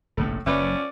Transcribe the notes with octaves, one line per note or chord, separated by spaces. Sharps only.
F1 A#1 A2 A3
F#1 F3 F#3 B3 C#4 B4 D5 E5